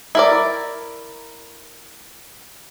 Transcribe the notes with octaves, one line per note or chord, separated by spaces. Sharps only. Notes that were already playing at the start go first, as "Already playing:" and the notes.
E4 A#4 D5